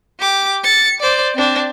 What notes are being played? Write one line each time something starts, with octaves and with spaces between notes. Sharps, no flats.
G4 D6
A6 C#7
C5 D5
C4 D4